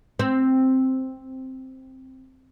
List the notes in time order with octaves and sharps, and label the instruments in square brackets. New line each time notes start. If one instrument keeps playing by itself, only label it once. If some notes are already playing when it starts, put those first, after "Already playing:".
[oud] C4